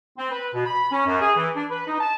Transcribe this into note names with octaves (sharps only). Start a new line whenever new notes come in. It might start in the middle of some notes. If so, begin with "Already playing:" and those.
C4
B4
B2
B5
C#4
F#2
G#4
E3
D4
B4
D#4
A5